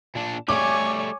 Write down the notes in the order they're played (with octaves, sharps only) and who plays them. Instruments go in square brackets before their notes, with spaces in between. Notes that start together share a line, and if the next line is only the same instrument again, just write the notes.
[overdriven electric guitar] A#2 D4
[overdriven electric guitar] G3 A3 [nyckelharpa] C#5 G#5 [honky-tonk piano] D6